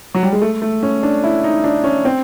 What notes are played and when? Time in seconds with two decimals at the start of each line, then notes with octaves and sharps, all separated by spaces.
0.15 F#3
0.23 G3
0.32 G#3
0.42 A3
0.62 A3
0.83 C#4
1.03 D4
1.23 E4
1.44 D#4
1.64 D4
1.84 C#4
2.05 C4